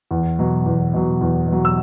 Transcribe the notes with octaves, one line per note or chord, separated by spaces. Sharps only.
E2
B2 F#3
E2
B2 F#3
E2
B2
F#3
E6